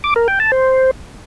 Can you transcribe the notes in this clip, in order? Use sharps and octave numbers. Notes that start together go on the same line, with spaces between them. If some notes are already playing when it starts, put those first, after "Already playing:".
D6
A#4
G5
A5
C5